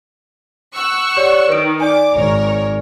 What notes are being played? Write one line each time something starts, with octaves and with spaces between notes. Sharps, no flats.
F#5 C#6 E6
G4 C#5 D5
D#3 B4 D7
D5 G#5 D6
G#1 A#4 C#5